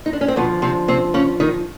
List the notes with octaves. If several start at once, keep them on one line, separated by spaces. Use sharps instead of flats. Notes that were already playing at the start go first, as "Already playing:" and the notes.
D#4
D4
C#4
C4
F2 B2 D3 F3 B3
C3 C4
C3 C4
C#3 C#4
D#3 D#4